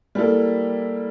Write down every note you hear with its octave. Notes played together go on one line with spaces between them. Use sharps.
G3 A#3 E4 A4